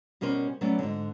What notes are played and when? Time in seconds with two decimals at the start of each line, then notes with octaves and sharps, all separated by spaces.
0.21 B2 G3 C#4 A#4 C5
0.61 F#3 G3 A3 B3 C#4 D5
0.79 G#2 D3